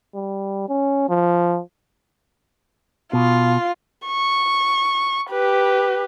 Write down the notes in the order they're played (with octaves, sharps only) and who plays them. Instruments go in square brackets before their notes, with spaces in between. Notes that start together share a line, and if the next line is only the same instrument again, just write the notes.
[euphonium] G3
C#4
F3
[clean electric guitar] B2 [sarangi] F4
[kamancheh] C#6
G4 B4